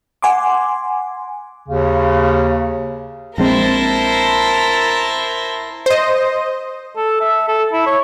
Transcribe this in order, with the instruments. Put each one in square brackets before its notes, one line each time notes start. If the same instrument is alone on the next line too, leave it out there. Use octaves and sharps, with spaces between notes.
[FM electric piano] F#5 G#5 C6 D6
[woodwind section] D#2 C#3
[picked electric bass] A#1 G#3 C4 [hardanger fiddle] E4 C5 [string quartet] A#4 A#6 [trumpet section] A5
[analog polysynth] C5 D#5
[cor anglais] A4
E5
A4
E4
C#5